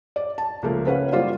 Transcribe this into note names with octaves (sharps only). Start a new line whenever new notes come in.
D5
A5
C#2 F3 A3 A#3
C#4 B4 C#5 F5 F#5
G3 A#3 F4 C5 D5 F5